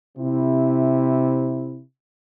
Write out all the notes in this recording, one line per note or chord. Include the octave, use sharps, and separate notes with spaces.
C3 E4